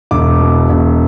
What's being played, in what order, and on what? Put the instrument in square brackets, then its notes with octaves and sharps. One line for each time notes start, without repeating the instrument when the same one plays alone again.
[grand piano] E1 D6
B2
E1